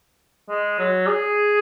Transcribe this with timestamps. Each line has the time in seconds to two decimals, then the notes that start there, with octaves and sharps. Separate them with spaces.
0.49 G#3
0.79 F#3
1.07 G#4